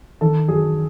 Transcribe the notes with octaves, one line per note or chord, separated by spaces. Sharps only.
D#3 A4
F#2 G#4